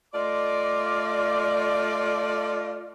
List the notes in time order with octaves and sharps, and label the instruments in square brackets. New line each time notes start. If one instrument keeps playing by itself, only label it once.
[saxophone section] A3 F4 D5 [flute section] D#5 C6 D6